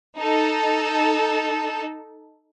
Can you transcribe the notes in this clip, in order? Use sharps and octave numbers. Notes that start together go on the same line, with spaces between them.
D#4 A4